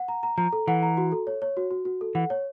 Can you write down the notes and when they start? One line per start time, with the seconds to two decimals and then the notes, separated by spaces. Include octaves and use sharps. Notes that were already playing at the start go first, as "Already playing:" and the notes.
Already playing: F#5
0.08 A#5
0.23 A#5
0.38 F3 A#5
0.53 A4
0.67 E3 F#5
0.83 A#5
0.97 F#4
1.12 A4
1.27 C#5
1.42 C#5
1.57 F#4
1.71 F#4
1.85 F#4
2.01 A4
2.15 E3 F#5
2.30 C#5